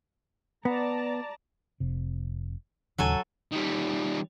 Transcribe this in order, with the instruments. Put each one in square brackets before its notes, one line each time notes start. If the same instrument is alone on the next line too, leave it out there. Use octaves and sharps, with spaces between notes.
[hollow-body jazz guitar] B3 [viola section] D5 A5 A#5
[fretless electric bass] F1 C3
[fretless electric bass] D1 D#2 C#3 [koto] F#3 A4 G#5
[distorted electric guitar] D#3 G3